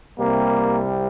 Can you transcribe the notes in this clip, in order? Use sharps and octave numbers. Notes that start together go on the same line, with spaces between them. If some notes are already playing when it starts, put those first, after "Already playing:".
C2 C3 G3 A#3